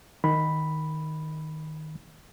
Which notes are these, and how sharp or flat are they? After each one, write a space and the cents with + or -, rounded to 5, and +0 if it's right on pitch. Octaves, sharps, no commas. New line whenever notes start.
D#3 +0 B5 +0